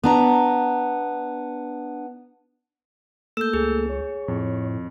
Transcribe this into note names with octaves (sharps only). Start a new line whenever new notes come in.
B3 D4 A#5
A3 A#3 A4 E6 G6 E7
C#2 G#4
C#5
F2 A2